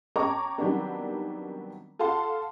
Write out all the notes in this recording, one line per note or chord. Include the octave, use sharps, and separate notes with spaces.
C#5 G5 A5 A#5 C#6 D6
D#3 F#3 G3 B3 C4 D4
F4 A4 F5 F#5 A5 C6